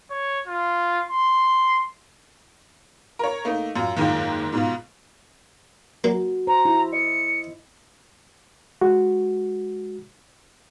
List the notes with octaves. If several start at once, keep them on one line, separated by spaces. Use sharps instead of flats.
C#5
F4
C6
A#4 C#5
A3 A#3 D#4
F#2 F4
F#1 D#2 G#2 F4 G5
G#2 B2 F4
F#3 A#3 F#4
C5 A#5
E4
D#5 C#7
G#3 F#4